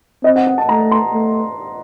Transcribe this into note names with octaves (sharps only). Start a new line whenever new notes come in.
C4 D#5
F#5
F#5
A5
A3 A#5
C6
A3